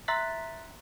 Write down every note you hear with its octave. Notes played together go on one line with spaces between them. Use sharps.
E5 A#5 C6 F#6 A6 B6